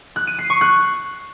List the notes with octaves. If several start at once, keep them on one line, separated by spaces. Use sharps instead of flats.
F#6
D#7
C7
C#6
F#6